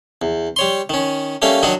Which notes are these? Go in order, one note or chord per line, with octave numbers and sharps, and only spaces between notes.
E2
G3 C#5 C6
D#3 C#4
G3 A3 A#3 C#4 F5
D#3 F#3 D4 D#4 F#4